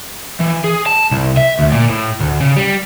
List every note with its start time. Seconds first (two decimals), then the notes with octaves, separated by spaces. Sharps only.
0.40 E3
0.64 G#4
0.86 A5
1.11 C2
1.37 E5
1.59 D2
1.72 A#2
1.90 A2
2.21 D2
2.41 C#3
2.57 G3